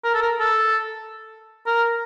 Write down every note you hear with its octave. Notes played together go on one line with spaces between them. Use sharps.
A#4
A4
A#4
A4
A#4